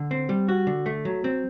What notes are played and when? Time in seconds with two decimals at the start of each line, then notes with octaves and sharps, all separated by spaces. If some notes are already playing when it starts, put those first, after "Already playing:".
Already playing: D3
0.11 C4
0.29 G3
0.48 F#4
0.67 D3
0.86 A3
1.05 F#3
1.24 C4